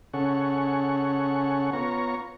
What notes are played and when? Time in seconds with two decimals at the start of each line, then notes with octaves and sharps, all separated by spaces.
0.14 C#3 C#4 G#4 A4 F#5 C#6
1.73 B3 F4 C#5 A#5 C#6